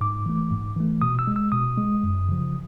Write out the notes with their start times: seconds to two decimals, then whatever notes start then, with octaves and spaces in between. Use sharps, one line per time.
0.01 G#2 D6
0.26 E3 A3
0.51 G#2
0.77 E3 A3
1.02 B2 D#6
1.19 E6
1.27 G#3
1.36 E6
1.52 B2 D#6
1.78 G#3
2.03 F#2
2.28 C#3 F3